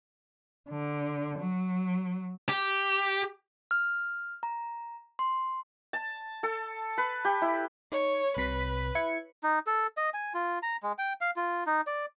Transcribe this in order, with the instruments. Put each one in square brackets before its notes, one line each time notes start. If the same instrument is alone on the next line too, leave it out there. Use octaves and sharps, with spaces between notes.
[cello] D3
F#3
[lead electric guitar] G4
[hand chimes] F6
A#5
C6
[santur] A5
A4
B4
G4
E4
[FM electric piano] D#4 [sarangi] C#5
[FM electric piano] C2 C3 B6 [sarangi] B4
[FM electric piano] E4 G#6 C#7
[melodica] D#4
A4
D#5
G#5
F4
A#5
G#3
G5
F5
F4
D#4
D5